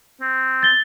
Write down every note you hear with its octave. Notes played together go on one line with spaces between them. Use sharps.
C4
A6 G7